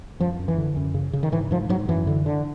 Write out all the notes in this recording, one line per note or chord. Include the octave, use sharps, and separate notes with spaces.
F#2 F3
F#2
E3
D3
F#2
C#3
C#3
D#3
G#2 E3
G#2 F3
G#2 F#3
F#2 E3
D3
D3